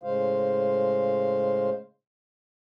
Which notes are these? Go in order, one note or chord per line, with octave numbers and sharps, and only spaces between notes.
A2 C#3 G#3 C5 F5